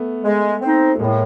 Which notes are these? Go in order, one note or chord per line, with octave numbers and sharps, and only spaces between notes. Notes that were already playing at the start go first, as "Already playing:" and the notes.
Already playing: A3 B3
G#3
C4 D#4
A3
A2 G#3 A#3